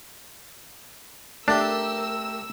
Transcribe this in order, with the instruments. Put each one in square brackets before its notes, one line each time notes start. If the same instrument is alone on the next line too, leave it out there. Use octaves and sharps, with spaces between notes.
[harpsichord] A3 G4 [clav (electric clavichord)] D4 [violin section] A#4 E6